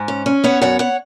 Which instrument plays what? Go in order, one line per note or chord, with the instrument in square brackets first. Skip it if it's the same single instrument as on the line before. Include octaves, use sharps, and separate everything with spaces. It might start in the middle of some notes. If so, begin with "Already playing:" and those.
Already playing: [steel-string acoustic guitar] G#2 G#5
C#4
C#4
B3 C#5 F#5
F#2 C#5 F#5
C#5 F#5